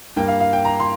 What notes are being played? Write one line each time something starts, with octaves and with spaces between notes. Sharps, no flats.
G2 G3 A#3 G5
F5
F5
G5
A#5
C6